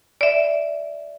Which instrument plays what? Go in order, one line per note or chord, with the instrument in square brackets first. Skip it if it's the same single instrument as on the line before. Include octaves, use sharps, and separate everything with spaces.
[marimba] D5 E5